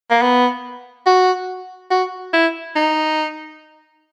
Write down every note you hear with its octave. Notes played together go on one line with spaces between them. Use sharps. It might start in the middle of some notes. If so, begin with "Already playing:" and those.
A#3
B3
F#4
F#4
E4
D#4